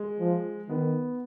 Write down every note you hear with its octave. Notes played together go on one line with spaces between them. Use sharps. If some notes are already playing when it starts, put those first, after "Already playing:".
Already playing: G#3
F3
D#3 B3